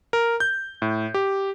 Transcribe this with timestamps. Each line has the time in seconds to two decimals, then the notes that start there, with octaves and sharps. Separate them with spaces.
0.13 A#4
0.40 G6
0.82 A2
1.14 G4